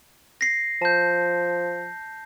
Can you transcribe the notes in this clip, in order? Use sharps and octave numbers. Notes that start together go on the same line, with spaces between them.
A#6 C7
F3 A5 G6